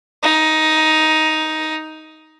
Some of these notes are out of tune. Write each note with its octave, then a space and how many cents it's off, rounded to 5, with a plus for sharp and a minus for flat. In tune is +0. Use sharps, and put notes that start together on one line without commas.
D#4 +10